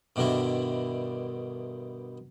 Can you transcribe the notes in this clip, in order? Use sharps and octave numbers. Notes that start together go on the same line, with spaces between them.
G2 B2 D3 D#3 E4